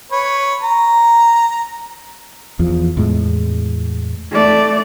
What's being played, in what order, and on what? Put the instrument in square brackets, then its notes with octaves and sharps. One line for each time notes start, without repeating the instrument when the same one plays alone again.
[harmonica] B4 C#5
A#5
[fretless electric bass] E2 F3
E2 A2 G#3
[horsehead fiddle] A3 D5